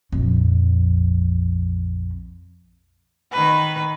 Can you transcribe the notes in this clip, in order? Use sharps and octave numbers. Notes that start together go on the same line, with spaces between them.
A#1 F2
D#3 B4